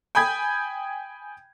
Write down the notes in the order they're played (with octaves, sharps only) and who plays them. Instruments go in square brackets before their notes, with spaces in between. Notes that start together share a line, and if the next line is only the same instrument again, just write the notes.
[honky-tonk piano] G5 G#5 B5 D#6 G6 G#6